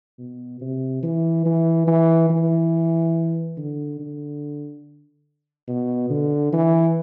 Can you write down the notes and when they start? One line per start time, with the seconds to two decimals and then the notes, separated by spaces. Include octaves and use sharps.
0.18 B2
0.61 C3
1.03 E3
1.46 E3
1.88 E3
2.30 E3
3.57 D3
4.00 D3
5.68 B2
6.10 D3
6.53 E3